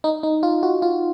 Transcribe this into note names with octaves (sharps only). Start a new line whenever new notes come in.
D#4
D#4
F4
F#4
F4